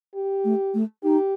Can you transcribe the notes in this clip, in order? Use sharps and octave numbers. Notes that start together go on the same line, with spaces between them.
G4
A3
A3
D#4 G4